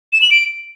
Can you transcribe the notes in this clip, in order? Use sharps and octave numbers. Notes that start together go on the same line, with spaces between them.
E7
F#7
D7